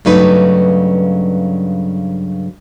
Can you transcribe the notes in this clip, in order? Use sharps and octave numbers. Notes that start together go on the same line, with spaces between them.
G2 C#3 F#3 A3 D#4 B4